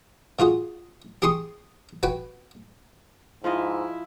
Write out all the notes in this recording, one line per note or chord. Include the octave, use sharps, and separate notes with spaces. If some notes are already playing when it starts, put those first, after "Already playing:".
D3 F4 F#4 G#4
G4 G#4 C6 C#6 D#6
F#4 B4 G5 G#5
G#2 F3 E4 F4 D#5